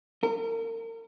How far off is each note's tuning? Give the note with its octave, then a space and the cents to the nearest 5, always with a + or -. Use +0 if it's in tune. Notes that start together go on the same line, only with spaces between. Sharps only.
A#4 -35